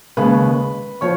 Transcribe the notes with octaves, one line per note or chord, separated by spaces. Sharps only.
D#2 C#3 G#3 B4 B5
F3 C#5 C#6